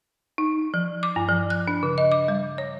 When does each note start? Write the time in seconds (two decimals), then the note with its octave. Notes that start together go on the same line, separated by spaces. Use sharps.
0.38 D#4
0.74 F3
1.03 D6
1.16 G2
1.29 F3
1.50 F#6
1.68 D4
1.83 C#3
1.98 D#5
2.12 D6
2.28 G3
2.58 C#5